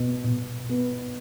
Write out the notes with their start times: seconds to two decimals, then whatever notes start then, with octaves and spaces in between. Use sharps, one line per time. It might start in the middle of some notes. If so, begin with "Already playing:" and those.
Already playing: B2 B3
0.24 B2
0.69 B3